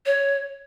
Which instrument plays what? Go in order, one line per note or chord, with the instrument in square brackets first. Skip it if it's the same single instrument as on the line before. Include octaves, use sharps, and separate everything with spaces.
[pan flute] C#5